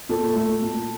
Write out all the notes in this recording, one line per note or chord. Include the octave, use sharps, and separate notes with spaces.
A#2 A4
A3
A#2